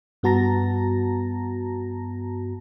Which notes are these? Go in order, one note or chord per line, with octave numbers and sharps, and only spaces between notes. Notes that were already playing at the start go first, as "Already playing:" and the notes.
G2 B3 F#4 A5 A#5 A#6